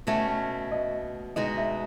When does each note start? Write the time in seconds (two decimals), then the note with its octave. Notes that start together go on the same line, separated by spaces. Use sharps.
0.07 B2 A3 C#4 F#4 E5
0.72 D#5
1.36 B2 G#3 D#4 F#4 D#5
1.57 E5